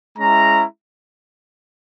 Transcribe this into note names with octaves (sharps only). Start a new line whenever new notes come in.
G#3 C#4 E4 A#5